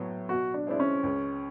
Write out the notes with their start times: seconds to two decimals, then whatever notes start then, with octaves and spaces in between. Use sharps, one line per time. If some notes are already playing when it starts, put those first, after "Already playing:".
Already playing: A2 F#3 B3
0.29 B2 F#4
0.54 D4
0.67 G#3 C4 D4 E4
0.80 C#4
1.03 C#2